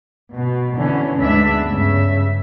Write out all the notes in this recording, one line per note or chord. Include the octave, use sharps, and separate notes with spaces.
B2
B2 D3 E3 B3 C#4
D2 G#2 G#3 B3 D4 E5
G2 C#3 E5